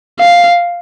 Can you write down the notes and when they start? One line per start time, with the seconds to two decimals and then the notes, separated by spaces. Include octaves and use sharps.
0.20 F5